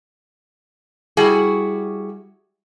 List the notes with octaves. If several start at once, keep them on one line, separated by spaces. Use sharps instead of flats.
G3 E4 F#4 G#4